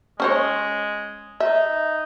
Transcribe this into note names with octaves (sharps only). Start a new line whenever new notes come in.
G#3 C#4 C5 C#5
D#4 E5